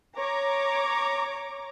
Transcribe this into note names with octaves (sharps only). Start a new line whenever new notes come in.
C#5 A#5 D6